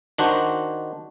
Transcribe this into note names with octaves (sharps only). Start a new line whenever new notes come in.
D#3 D4 F#4 C5